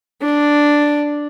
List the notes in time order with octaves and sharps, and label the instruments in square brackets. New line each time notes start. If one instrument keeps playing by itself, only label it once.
[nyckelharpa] D4